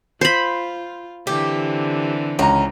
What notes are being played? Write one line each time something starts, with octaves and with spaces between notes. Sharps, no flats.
F4 C5 B5
D3 E3 C4 G4
C#2 C#4 A#5